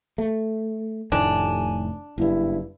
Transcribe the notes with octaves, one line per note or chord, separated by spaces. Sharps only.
A3
F1 A2 D#3 D4 G#5
F#1 G2 E4